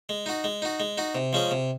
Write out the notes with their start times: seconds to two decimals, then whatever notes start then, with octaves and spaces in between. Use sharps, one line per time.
0.09 G#3
0.26 D#4 F#4
0.44 G#3
0.62 D#4 F#4
0.80 G#3
0.97 D#4 F#4
1.15 C3
1.33 F3 G#3 C#4 G#4
1.51 C3